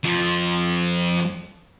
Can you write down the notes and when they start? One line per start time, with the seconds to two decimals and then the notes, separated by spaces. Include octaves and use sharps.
0.04 F2 F3